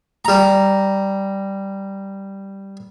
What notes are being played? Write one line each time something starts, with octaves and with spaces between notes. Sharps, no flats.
G3 A#5